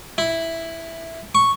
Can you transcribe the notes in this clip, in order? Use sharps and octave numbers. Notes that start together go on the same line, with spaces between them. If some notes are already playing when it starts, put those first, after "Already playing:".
E4
C#6